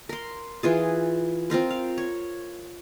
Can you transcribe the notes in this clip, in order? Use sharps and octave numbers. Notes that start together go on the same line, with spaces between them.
A#4 C6
E3 F4 G#4
C4 F4 A#4 C5
F5
C#5